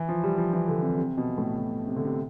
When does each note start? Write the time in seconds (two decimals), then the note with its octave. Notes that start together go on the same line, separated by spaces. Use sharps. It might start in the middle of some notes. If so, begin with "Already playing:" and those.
Already playing: E3
0.09 F3
0.23 G3
0.38 F3
0.53 E3
0.68 D3
0.82 C3
0.97 C3
1.18 B2
1.38 A2
1.58 B2
1.87 C3
1.96 D3
2.05 C3